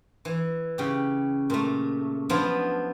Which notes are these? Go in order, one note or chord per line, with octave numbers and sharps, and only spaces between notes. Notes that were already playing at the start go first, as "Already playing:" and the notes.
E3
C#3 G4
A#2 A3
F3 F#3 B3 D4 E4 F4